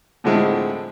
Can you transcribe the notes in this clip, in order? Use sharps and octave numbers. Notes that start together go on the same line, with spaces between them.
A2 D3 F3 G#3 C4 E4